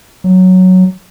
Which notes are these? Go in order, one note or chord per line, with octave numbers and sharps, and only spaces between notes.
F#3